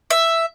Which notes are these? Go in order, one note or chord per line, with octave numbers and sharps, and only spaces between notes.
E5